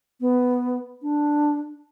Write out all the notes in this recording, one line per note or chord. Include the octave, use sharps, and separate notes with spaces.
B3
D4